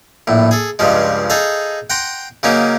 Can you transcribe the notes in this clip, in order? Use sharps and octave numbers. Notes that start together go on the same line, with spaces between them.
A#1 A2
G#4 A4
C#2 G2 C#3 F3 G#3
D#4 G#4 A4 F5
F#5 G5 A#5 C6
C#3 F#3 A#3 C#4 D#4